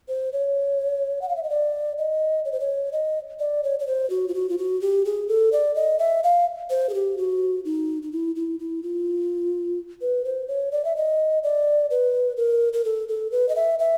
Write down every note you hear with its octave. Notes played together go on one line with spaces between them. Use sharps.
C5
C#5
F#5
F5
E5
D#5
D5
D#5
C#5
C5
C#5
D#5
D5
C#5
C#5
C5
F#4
F4
F#4
F4
F#4
G4
G#4
A4
D5
D#5
E5
F5
C5
G#4
G4
F#4
D#4
D#4
E4
E4
E4
F4
B4
C5
C#5
D5
E5
D#5
D5
B4
A#4
A#4
A4
A4
B4
D#5
E5
E5